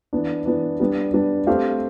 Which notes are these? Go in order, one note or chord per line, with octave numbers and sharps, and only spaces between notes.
E3 B3 D4
E3 B3 D4
G3 B3 D4
G3 B3 D4
A3 C4 G4 C5 F5